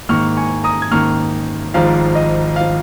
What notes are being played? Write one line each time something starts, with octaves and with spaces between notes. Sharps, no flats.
G#2 D#3 A#3 C#6 F6
G#5 C#6
A#5 D#6
G#6
G#2 D#3 A#3 C#6 F6
G#1 G#2 F3 F5
D#5
F3 F5